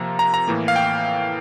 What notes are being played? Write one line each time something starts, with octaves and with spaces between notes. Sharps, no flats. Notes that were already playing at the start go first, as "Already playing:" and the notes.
Already playing: C3 F3 A#3 A#5
A#5
A#5
A2 E3 A#3
F5
G5